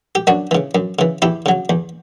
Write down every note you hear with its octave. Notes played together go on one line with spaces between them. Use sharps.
G4
F#2 D4 F#4
C#3 E3
F#2
C#3 E3
E2 E4 G4
C#3 F#3
E2